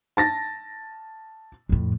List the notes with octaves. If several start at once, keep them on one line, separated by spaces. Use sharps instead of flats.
A5 A6 A#6
F2 A2